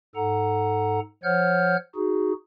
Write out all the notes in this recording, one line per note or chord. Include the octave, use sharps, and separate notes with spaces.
G#2 A4 F#5 A#5
F3 C5 C#5 F#5 F6 G6
D#4 F#4 G#4